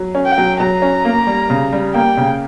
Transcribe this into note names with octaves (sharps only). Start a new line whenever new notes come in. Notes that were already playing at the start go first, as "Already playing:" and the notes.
Already playing: F#3
C#4
G5
F#3
F#3 A#5
C#4
A#3
G3
C#3
G3
A#3 G5
C#3